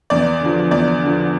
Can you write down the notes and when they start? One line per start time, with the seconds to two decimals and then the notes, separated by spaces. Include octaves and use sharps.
0.10 E2 D5
0.41 D3
0.46 F3
0.71 E2 D5
1.02 D3 F3